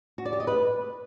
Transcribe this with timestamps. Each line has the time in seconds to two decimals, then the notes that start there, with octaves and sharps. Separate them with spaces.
0.18 F#4
0.25 D5
0.33 G4
0.40 D#5
0.47 B4